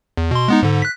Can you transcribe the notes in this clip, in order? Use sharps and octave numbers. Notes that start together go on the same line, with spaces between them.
E2
B2 C6
G#3 B3 D#4
G#2 D3
F#6 B6